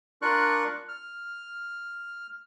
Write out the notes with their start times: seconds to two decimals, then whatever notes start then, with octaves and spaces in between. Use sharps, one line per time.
0.22 D4 F4 A#4 D5 C#6 F#6
0.89 F6